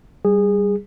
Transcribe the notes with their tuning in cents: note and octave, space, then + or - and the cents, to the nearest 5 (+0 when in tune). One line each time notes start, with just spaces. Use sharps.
G3 +0 G#4 -20